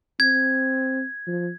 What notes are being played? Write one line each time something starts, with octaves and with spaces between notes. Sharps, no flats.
C4 G#6
F3